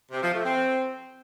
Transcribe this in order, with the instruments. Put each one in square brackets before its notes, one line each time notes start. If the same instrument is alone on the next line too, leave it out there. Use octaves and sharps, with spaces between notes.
[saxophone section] C3
F3
A3
C4